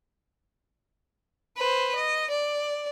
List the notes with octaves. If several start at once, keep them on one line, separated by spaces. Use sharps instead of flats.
B4 C5
D#5
D5